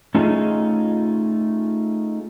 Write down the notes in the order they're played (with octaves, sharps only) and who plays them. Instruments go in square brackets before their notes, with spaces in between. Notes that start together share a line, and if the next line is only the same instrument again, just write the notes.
[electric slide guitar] A3 C#4 D#4 F4 G#4